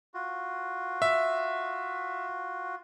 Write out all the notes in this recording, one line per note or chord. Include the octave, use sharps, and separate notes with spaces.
F4 F#4
E5